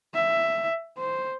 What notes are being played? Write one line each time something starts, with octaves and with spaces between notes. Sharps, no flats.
E5
C5